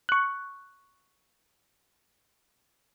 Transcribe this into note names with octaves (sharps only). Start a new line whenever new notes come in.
C#6 F#6